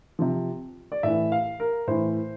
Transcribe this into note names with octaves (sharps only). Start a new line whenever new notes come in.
C3 F3
D5
A2 E3 E5
F5
A#4
A2 E3 C5